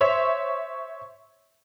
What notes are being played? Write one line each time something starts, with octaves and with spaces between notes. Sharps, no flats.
C5 C#5 E5